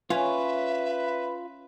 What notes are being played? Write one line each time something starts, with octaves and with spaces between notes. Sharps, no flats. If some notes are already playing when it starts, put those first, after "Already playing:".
C#4 F4 B4 E5